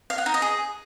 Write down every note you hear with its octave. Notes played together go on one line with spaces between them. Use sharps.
F5
F#5
D#4
D#5
G#4